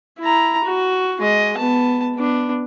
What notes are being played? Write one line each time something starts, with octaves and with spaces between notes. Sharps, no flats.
E4 A#5
F#4
G#3 D#5
B3 A5
B3 D4